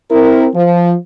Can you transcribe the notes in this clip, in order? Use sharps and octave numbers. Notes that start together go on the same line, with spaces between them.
C4 E4 A#4
F3